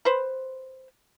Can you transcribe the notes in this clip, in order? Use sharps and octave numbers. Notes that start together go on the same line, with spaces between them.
B4 C5